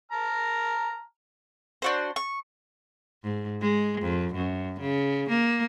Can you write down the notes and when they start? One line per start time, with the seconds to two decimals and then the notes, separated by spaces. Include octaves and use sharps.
0.12 A5 A#5 F6
1.82 D4 F#4 C5
2.16 C#6
3.24 G#2
3.61 G#3
4.01 F2
4.35 F#2
4.81 C#3
5.30 A#3